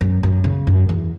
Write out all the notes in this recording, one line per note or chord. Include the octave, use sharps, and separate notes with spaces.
F#2
F#2
C#3
F#2
E2